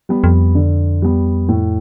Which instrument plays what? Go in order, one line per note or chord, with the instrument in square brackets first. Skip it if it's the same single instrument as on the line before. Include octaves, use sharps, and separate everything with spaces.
[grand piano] G3 B3
[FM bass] F2
[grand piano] D3
G3 B3
A2